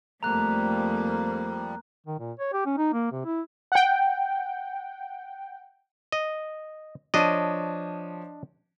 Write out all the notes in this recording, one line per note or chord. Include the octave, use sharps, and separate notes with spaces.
F2 F3 G3 A3 A#3 A#5 F#6
D#3
A#2
C#5
G4
C#4
D#4
A#3
C3
E4
F#5 G5
D#5
F3 D4 C#5 D#5 D#7